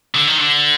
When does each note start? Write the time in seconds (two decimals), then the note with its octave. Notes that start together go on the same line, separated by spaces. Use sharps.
0.15 D3
0.27 D#3
0.39 D3